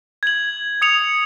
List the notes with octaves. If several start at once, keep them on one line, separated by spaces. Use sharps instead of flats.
G#6 F#7
D#6 C#7 F7